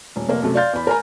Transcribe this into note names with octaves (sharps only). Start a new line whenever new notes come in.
D#1
F1 A#3
F#2 C3 A3
D5 F5 C6 F6 G6 A6
E2 B5
A#4 G#5 A#5